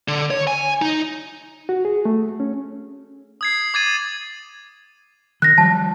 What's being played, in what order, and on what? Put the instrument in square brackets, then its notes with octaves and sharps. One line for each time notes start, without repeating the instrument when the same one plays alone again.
[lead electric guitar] D3
C#5
G#5
D#4
[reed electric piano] F#4
G#4
A3
C#4
[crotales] D#6 G#6 C7
D6 G#6 A6 D#7
[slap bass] D#3 [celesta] F#6 A#6
[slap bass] F3 G3 [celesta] A5